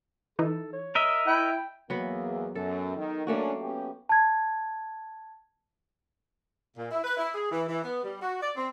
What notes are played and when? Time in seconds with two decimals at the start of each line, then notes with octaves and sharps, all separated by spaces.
0.39 E3 D#4 E4 A4
0.73 C#5
0.95 A#4 D#5 E5
1.27 E4 G5
1.90 E2 F#3 A#3 B3
2.55 F#2 A4
2.96 D#3
3.27 A3 A#3 C#4 D4 F#4
3.60 B3 C#4 G4
4.09 A5 G#6
6.77 A#2
6.91 E4
7.04 B4
7.17 E4
7.34 G#4
7.51 E3
7.69 E3
7.84 B3
8.03 G3
8.22 F#4
8.41 D5
8.56 C4